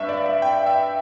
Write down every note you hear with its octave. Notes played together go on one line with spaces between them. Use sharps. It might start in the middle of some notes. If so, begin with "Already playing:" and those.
Already playing: G2 E5
D5
E5
G5
E5